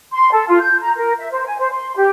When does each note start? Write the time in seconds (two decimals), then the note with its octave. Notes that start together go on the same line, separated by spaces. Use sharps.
0.12 C6
0.31 A4
0.47 F4
0.60 G6
0.80 A#5
0.96 A#4
1.19 E5
1.31 C5
1.46 G#5
1.58 C5
1.71 C6
1.96 G4